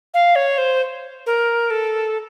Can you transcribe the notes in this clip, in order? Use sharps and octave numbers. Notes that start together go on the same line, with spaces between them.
F5
C#5
C5
A#4
A4